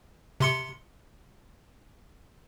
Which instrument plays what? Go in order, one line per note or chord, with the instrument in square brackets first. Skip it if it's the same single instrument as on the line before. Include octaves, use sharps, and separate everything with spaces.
[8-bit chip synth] C3 C6 C#7